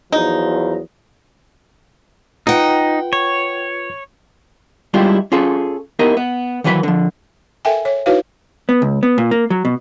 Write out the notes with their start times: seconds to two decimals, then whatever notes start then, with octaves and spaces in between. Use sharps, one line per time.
0.12 E2 F3 F#3 D#4
2.47 D#4 F4 B4 F#5 G5
3.13 C#5
4.94 G3 G#3 D4 E4 F4 G4
5.32 C#4 F4 G#4 A4
5.99 B3 D#4 E4 G4 A#4 D#5
6.17 B3
6.64 D#3 E3 F#3 B4 C#5 B5
6.83 D3 F3
7.65 A4 A#4 E5 G5 G#5
7.85 C#5
8.06 D#4 E4 F#4 B4 C#5 F5
8.69 B3
8.82 C#2
9.03 B3
9.18 A#2
9.31 A#3
9.50 F#3
9.65 B2